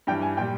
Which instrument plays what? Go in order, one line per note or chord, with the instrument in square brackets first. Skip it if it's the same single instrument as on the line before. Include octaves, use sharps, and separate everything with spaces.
[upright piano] G2 E3 G3 G5
G#5
A#2 G3 G5